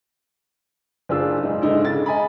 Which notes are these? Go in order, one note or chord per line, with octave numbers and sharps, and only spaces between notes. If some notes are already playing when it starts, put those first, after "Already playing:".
F#1 D4 F4 G#4 E6
G#2 D4 D#4
G#2 D3 D#4 E4
C#3 A6
D#5 G#5 A#5 B5